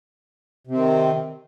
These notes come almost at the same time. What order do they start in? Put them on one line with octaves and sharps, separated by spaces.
C3 C4 D#3